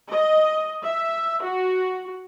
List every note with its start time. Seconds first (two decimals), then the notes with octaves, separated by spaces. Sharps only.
0.11 D#5
0.84 E5
1.43 F#4